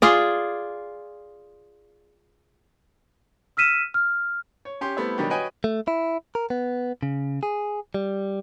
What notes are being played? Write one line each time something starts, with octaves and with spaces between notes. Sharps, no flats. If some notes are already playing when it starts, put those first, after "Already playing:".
F4 G#4 D5
E6 F6 B6 D#7 E7
F6
C#5
C#4 G4 C6
G3 A3 B3 C4 E4 E5
B2 D#3 F#3 G3 D4 G4
F#4 B4 C#5 D#5 G5 G#5
A3
E4
A#4
B3
C#3
G#4
G3